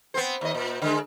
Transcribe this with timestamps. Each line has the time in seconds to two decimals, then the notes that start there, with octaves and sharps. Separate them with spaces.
0.14 B3 C4 C5
0.41 D#2 D#5
0.54 A#2
0.82 D3 G#3